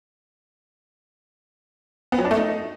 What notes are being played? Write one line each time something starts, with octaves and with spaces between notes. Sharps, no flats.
B3
F#3
D4
A3
D#4